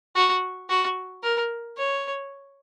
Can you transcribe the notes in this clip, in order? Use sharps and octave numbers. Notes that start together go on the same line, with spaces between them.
F#4
F#4
A#4
C#5